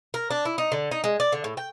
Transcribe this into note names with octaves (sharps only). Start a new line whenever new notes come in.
A#4
D4
E4
D#4
D3
D#4
G#3
D5
D3
A2
G5